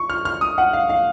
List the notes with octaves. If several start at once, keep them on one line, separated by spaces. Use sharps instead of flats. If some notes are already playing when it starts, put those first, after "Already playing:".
Already playing: C#6
F6
F6
D#6
F#5
F5
F5